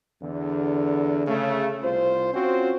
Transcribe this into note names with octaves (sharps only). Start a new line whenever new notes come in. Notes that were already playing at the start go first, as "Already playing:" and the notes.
E2 D3
C#3 A3
C2 F4 C5
C4 C#4 F4 F#4 C5